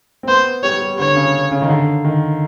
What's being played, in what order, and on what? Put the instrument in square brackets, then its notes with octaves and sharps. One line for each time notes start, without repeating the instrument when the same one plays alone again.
[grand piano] C4
[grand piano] B3 [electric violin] C5
[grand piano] G3 [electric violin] C#5
[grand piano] G3
[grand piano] D3 [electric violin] C#5
[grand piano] C#3
C#3
D#3
D3
D#3